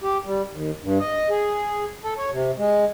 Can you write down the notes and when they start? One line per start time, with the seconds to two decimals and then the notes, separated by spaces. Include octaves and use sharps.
0.01 G4
0.26 G3
0.51 D#2
0.83 G2
1.00 D#5
1.30 G#4
2.03 A4
2.18 C#5
2.32 C3
2.58 G#3